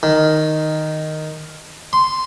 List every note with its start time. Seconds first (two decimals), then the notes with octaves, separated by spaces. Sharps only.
0.03 D#3
1.93 C6